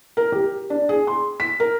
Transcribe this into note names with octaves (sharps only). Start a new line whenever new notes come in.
A#4
G4
D4
G#4
C6
B6
A#4